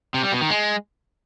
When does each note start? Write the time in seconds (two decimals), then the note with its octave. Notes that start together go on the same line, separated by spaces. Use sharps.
0.14 C3
0.23 G3
0.32 B2
0.41 D#3
0.50 G#3